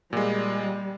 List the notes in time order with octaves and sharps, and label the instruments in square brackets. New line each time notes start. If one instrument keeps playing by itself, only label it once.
[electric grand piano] A#2 G#3 [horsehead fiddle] G3